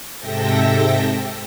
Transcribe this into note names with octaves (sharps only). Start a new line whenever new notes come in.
G#2 C3 A4 E5 G5 A#6